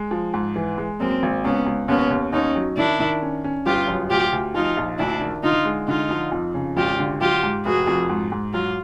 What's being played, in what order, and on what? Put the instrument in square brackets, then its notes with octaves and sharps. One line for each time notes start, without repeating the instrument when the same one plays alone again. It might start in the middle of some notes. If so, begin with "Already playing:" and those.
Already playing: [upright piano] G#3
F3
G#2
E3
G#3
[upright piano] F#2 [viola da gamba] A#3 C4
[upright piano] G#1
[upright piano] C#2 [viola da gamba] B3 C#4
[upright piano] C#2
[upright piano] D#2 [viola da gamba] B3 C#4
[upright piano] D#2
[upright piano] D#2 [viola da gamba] C#4 D#4
[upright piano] F#3
[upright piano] D#3 [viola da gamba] D4 E4
[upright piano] D#3
C#4
C#4
[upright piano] G1 [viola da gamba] F4 G4
[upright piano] F#2
[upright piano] D2 [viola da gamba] F4 G4
[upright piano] D2
[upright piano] F3 [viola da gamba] D#4 F4
[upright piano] A#1
[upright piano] D2 [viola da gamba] D4 E4
[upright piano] D#3
[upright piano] D3 [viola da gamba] D#4 F4
[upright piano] G#3
[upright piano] D3 [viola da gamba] D#4 F4
[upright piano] F3
F2
C#3
[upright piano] G#1 [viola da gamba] F4 G4
[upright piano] D3
[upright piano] F#3 [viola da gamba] F4 G4
[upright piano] G#2
[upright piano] F1 [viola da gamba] F#4 G#4
[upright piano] F2
G#2
G#2
[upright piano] F#3 [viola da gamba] F4